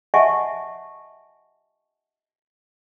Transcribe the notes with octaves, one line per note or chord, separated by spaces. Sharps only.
D#5 E5 F#5 G#5 A5 C#6